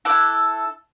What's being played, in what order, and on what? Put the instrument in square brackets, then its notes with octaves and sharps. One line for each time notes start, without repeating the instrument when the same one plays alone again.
[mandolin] E4 A4 D6 F#6